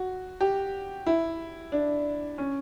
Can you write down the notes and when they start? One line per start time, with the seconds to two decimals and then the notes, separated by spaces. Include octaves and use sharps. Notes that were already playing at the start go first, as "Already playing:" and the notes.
Already playing: F#4
0.41 G4
1.07 E4
1.72 D4
2.38 C#4